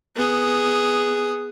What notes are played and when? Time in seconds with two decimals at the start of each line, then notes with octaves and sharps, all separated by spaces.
0.16 B3 G#4